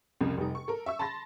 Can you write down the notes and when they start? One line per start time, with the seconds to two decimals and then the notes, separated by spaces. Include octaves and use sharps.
0.21 C2 F2 C#3
0.37 F1 G3 D#4
0.55 C#6
0.68 A4 A#4
0.86 E5 C#6 E6
0.99 A5 B5 C6 A6 A#6